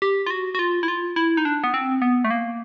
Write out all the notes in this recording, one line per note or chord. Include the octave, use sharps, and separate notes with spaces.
G4
F4
F#4
F#4
F4
E4
F4
E4
D#4
D4
B3
C4
B3
A3
A#3